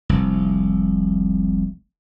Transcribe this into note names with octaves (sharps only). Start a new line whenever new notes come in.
F1 C2